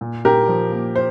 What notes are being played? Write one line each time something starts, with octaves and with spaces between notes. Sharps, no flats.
A#2
A#2 G4 A#4
F3
A#3
C5